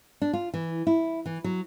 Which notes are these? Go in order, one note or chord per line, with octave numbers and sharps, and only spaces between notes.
D4
F4
E3
E4
E3
F#3